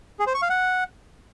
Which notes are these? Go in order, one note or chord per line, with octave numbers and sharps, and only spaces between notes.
G#4
C5
C#6
F5
F#5